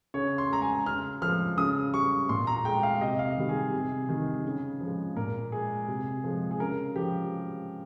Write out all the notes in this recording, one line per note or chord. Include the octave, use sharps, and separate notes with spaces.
C#3 C#5
C6
G#3 A#5
G#5
C#3 F6
F3 G#3 F6
C#3 D#6
G3 C#6
A#2 C6
A#5
G#3 G5
F5
C3 D#5
F5
D#5
D#3 G3
G#4
C3
D#3 G3
C#3
F3 G#3
A#2 A#4
G#3 G#4
C3
F3 G#3
G#4
C#3 A#4
F3 G#3 G4